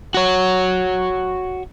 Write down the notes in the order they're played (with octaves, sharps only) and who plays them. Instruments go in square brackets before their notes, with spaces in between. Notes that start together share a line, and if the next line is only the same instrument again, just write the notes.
[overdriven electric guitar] F#4 C#5